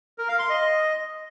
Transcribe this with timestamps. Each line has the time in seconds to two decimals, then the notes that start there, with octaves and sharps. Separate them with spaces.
0.18 A#4
0.29 F5
0.39 C6
0.49 D#5